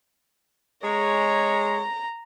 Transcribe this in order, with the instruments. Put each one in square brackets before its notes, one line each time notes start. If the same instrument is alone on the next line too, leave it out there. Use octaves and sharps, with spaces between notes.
[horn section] G#3 C#5 [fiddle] A#5